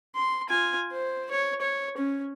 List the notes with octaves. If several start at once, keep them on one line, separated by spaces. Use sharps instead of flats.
C6
F4 G#5
C5
C#5
C#5
C#4